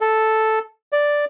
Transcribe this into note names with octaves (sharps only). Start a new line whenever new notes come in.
A4
D5